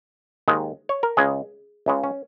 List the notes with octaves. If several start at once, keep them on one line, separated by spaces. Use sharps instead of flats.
D#2 D#3 G#3
C#5
A#4
C#2 C#3 G#3 G#4
C#2 C#3 G#3
C#4